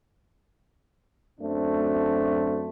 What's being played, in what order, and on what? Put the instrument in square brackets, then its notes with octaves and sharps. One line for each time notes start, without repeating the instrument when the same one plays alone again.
[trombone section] F#2 A3 C4 D4